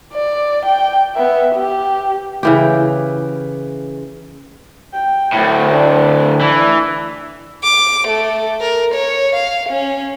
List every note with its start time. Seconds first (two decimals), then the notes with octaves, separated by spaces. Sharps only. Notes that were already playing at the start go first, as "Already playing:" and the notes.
0.14 D5
0.65 G5
1.16 B3 E5
1.56 G4
2.43 C#3 E3 G4
4.93 G5
5.33 D2 A2
5.71 D4
6.41 E3
7.63 D6
8.08 A3
8.61 A#4
8.94 C#5
9.35 F5
9.69 C#4